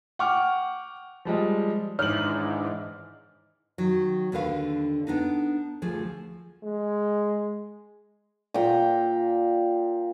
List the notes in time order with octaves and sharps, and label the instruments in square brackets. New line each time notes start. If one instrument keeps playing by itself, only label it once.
[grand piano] F#5 G5 C#6 D6 F6
F3 G3 G#3
[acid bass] G#2 [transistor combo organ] D#3 E3 D4 [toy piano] C#5 [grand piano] F6 F#7
[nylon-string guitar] D#3 F#3
D#2 D3 D4 B4 F5
B3 D4 D#4
D2 F3 G#4
[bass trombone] G#3
[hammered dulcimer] A#2 G5